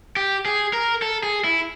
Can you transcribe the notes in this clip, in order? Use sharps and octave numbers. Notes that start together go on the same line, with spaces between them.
G4
G#4
A#4
A4
G#4
E4